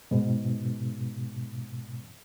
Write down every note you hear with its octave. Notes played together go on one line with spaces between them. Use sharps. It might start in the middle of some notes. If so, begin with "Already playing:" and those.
G#2 B2